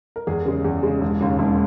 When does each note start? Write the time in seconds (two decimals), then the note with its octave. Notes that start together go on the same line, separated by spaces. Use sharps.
0.16 A#4
0.27 E2 G#4
0.46 C#3 G#3
0.64 E2
0.83 C#3 G#3
1.01 E1
1.21 D#2 C#3
1.39 E1